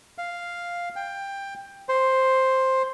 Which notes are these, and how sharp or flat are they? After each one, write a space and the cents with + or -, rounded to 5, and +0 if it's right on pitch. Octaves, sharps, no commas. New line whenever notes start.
F5 +0
G5 +15
C5 +5